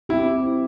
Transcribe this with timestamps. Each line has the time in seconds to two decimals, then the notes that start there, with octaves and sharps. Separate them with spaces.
0.09 C4 E4 G4